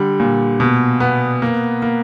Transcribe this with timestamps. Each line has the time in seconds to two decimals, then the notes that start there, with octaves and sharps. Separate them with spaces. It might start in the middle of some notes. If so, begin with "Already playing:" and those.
Already playing: D3 G3
0.20 A#2
0.60 B2
1.00 B3
1.42 A#3
1.82 A#3